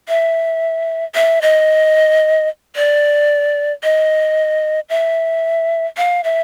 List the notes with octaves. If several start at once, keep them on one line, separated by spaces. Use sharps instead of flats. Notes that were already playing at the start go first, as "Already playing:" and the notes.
E5
E5
D#5
D5
D#5
E5
F5
E5